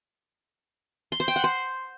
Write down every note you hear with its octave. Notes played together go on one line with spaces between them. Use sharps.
C6
C5
G5
F#5
C5